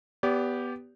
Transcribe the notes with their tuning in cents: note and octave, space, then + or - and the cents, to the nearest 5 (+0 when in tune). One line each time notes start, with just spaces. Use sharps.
B3 +0 G4 +0 D5 -35